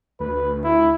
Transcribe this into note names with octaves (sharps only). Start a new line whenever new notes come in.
D2 B4
E4